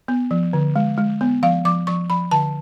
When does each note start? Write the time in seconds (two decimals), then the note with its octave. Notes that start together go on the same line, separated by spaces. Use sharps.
0.08 B3
0.31 F3
0.53 D3
0.76 G#3
0.98 G#3
1.21 B3
1.43 F3 F5
1.65 F3 D6
1.87 F3 C#6
2.10 F3 B5
2.31 D3 A5